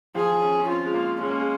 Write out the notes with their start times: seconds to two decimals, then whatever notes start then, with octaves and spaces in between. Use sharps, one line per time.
0.15 F3 G#4
0.42 C#4
0.60 C#4
0.68 C4 F4
0.85 G#3
0.94 A#3
1.20 G#3 C#4
1.30 A#3
1.40 G#3